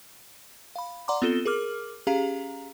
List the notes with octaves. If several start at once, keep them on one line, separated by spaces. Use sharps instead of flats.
F5 B5
D5 F#5 A#5 C6 D6
B3 C4 F4 A4 E7 G7
G#4 A#4 D6 F6
C#4 G4 G#4 F5 A#5